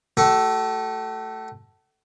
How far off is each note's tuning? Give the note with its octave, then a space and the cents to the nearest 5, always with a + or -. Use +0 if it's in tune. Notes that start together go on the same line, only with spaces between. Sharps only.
A3 +0 F#4 +45 A4 +0